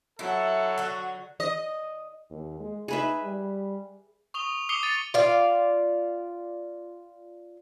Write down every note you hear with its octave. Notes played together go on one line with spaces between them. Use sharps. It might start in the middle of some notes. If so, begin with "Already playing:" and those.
F#3 E4 A4
D3 F#4
D#5
D#2
G#3
D#4 G#4 B4 E5
G3
C#6 D#6 F7 G7
D6 D#6 C7 C#7 F7 G7
A6 D#7
F4 D5 F5